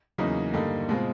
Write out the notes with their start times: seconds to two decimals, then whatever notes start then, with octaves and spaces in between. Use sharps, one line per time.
0.18 E2 C#3 F#3 A#3 D#4
0.53 G2 D3 G3 A#3 D#4
0.89 B2 G#3 C4 F4